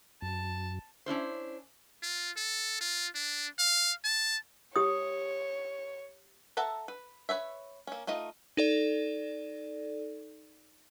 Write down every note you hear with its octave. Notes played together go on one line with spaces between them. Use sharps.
F#2 A5
C#4 D4 E4 C5
F4
A4
F4
D4
F5
A5
G4 C#5 D#6
A4 E5 F#5 A5 A#5
B4
B4 C#5 E5
A#3 C#4
A3 D#4 F4 D#5
D#4 A4 D5